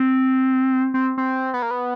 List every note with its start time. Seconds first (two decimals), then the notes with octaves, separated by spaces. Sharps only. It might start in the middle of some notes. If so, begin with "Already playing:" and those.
Already playing: C4
0.94 C4
1.18 C4
1.54 B3
1.62 A#3
1.71 B3